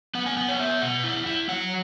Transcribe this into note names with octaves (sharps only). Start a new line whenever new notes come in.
B3 F#5
G#5
B3 F#5
C#5
B3 E5
B2 F#5
E4
E4
F#3 F#5